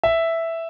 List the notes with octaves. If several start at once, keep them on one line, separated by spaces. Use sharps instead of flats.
E5